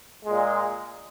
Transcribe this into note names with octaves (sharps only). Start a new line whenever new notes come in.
A#2 G#3